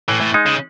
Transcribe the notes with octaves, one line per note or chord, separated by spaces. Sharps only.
A2 E3
A2
G#3 D#4
C#3